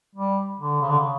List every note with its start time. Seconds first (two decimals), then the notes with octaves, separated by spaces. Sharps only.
0.15 G3
0.60 D3
0.82 C#3
0.89 D3
0.99 C#3